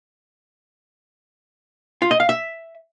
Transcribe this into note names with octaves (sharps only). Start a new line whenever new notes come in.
F4
D#5
F5
E5